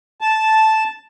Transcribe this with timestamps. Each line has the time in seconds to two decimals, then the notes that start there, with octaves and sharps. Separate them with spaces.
0.21 A5